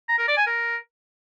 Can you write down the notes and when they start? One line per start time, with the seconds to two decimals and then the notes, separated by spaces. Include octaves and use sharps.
0.09 A#5
0.18 A#4
0.28 D5
0.37 G#5
0.47 A#4